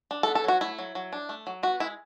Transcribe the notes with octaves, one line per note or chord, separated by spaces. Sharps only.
D4
A4
B3
A4
F#3 F#4
A3 E4
F#3
F#3
D4
A3
F#3
B3 F#4
G#3 E4